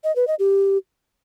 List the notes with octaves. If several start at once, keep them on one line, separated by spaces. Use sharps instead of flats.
D#5
B4
D#5
G4